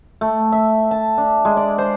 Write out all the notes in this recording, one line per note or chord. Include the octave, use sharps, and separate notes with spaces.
A3
E5
A5
D4
G#3
D5
C5